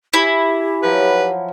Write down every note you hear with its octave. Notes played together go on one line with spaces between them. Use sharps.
E4 G4 G#5
F3 F#3 B4